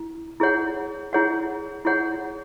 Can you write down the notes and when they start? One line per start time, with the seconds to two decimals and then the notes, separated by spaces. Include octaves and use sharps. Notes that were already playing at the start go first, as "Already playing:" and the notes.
Already playing: E4
0.40 E4 G#4 C#5 F#5
1.13 E4 G#4 C#5 F#5
1.85 E4 G#4 C#5 F#5